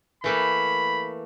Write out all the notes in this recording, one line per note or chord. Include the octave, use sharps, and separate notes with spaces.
E3 A3 A#3 B5